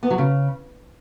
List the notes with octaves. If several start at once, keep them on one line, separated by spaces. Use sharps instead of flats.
B3
F#3
C#3